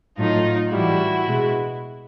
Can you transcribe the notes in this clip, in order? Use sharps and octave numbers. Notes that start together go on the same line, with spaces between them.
A2 F#3 A3 D#4 F4
A2 E3 G3 E4 F#4
B2 G#3